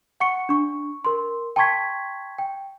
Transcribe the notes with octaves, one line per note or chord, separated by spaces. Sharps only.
F#5 C#6 C#7
D4 C#6
A#4 C6
G5 A5 C6 C#6 G#6 B6
G5